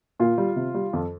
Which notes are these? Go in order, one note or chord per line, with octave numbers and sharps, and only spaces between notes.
A#2 F4
G3
C3
G3
F2